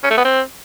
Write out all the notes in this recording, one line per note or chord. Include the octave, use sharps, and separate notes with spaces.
C#4
A3
B3
C4